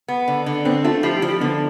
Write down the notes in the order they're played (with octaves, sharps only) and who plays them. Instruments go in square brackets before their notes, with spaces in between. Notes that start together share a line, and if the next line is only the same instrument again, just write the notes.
[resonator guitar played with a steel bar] B3
D3
D3
[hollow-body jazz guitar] B3 D4 [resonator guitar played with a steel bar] C4
[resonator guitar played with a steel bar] A3 [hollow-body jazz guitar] D4 F4
[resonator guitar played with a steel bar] F3 [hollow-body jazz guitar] E4 G4
[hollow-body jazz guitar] E4 G4
[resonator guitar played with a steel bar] F3
[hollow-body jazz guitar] E4 G4
[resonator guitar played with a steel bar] D3 [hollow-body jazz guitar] B3 D4